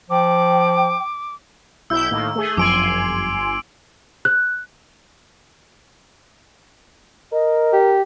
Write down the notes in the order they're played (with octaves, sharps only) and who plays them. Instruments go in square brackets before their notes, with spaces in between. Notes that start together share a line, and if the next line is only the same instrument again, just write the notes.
[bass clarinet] F3 [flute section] G5 [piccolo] D6
[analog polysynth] B1 E4 G6 [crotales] E6
[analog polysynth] A2 D#3 A#3
A3 G#4
[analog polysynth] G1 G#5 C6 [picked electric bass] F#2 F3 [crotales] D6 D7 F#7
[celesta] F#6
[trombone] A#4 [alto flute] D#5
[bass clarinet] G4